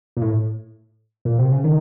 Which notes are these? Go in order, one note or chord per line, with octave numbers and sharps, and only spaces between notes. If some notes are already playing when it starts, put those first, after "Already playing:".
A#2
A2
A#2
C3
C#3
D#3